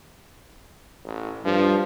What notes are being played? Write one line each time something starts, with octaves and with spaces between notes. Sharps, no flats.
A1
G2 F3